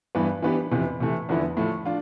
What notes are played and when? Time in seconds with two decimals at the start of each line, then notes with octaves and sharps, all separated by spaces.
0.15 G2 E3 B3
0.42 E3 B3 D4 G4
0.71 F2 C3 E3 B3
1.00 C3 E3 A3
1.29 E2 D3 F3 B3 E4
1.57 A2 F3 A3
1.85 D4 F4